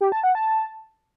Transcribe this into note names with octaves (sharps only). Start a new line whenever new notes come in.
G4
A5
F#5
A5